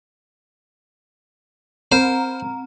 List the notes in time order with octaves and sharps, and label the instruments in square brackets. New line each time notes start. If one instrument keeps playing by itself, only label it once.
[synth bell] C4 A#5 [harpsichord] C5